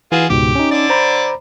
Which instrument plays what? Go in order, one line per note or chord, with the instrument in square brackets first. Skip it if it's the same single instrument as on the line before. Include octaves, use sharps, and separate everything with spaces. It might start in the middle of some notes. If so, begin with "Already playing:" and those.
[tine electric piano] E3 [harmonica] F4 F#4 G#4
[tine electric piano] C#2 G#2 B2 [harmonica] G4
[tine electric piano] C#4 D#4
[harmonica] D3 D4 D5
[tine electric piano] C5 A#5 B5